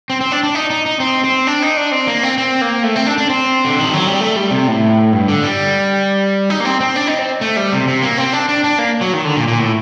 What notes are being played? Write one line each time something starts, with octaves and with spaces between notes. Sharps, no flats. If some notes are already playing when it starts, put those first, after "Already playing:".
C4
C4
D4
D4
D#4
D#4
D#4
C4
C4
D4
D#4
D4
C4
A#3
C4
C4
A#3
A3
C4
D4
D4
C4
D3
D#3
F#3
G3
A3
G3
C3
A2
G2
D3
G3
D#4
A#3
C4
C4
D4
D#4
C4
A3
G3
C3
C3
A#3
C4
D4
D4
D4
A#3
F#3
D#3
D3
A#2
A#2
A2